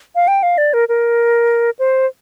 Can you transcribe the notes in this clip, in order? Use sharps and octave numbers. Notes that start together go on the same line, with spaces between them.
F5
G5
F5
D5
A#4
A#4
C5